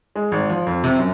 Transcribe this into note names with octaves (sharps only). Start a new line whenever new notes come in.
G#3
G#1
F3
F2
C3
F#2